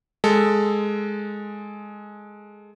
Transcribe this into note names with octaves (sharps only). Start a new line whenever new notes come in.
G#3 A4